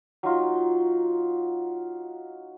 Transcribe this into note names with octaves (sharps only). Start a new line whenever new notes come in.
F#3 D#4 F4